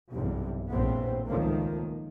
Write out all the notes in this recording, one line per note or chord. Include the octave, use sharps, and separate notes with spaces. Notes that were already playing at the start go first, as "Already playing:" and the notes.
B1 E2 G2 C3
A#1 E2 A2 B3 C4
C#2 D#3 F3 A3 A#3